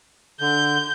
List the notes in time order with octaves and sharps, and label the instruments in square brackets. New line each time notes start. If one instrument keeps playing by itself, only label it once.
[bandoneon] D3 [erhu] G6